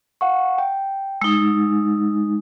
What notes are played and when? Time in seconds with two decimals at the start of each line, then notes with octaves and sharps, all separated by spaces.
0.21 F5 F#5 C#6
0.58 G5
1.21 G#3 D#4 E6